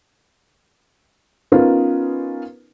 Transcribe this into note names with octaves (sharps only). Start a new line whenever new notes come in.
B3 C#4 D#4 F4 A#4 B4